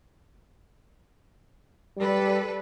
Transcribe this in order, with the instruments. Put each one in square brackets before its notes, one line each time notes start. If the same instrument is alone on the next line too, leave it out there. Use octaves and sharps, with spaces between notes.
[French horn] G3 [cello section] A4 B4 D5